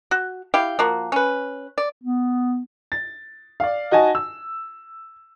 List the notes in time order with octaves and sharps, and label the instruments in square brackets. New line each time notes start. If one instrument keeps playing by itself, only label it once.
[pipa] F#4
E4 G4 F5 G5
F3 A#3 F#4
C#4 B4
D5
[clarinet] B3
[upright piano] A6
D5 F5
D#4 F#4 D#5 G#5 A5
E6